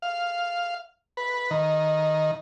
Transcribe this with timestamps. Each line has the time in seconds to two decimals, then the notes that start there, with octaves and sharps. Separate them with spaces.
0.02 F5
1.17 B4
1.51 D#3